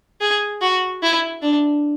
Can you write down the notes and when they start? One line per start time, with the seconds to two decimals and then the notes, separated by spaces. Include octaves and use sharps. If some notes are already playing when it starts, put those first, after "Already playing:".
0.21 G#4
0.62 F#4
1.03 E4
1.42 D4